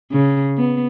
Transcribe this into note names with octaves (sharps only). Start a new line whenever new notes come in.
C#3
B3